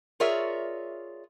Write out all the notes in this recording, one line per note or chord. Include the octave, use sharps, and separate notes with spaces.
F4 G#4 A#4 C#5 D5 E5